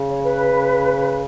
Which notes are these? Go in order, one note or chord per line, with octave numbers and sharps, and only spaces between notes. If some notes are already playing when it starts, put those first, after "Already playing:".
Already playing: C#3
C#5
B4